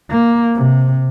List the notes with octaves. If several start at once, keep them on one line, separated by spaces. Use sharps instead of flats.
A#3
C3